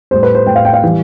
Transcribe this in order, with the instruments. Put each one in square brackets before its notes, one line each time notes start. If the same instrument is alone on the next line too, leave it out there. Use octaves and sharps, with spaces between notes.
[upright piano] A2 G3 C5
B4
C5
A2 G3 G5
F5
G5
F5
E3 G3